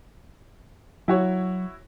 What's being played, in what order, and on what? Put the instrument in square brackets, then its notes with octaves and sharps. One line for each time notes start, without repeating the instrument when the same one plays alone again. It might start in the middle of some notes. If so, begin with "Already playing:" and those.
[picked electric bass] F#3 [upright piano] E4 F#4 C#5